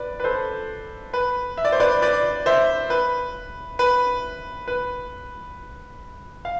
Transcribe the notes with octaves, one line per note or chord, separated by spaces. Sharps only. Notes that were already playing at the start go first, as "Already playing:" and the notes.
Already playing: B4 D5
B4
A4 C5
B4
E5
D5
C5
B4 D5
B4 D5
C5 E5
B4
B4
B4
F5